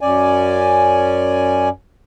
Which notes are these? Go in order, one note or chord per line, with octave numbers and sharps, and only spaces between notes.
F#2 C#4 D5 G#5